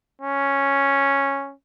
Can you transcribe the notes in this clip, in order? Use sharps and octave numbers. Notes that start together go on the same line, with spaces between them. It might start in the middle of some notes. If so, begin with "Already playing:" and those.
C#4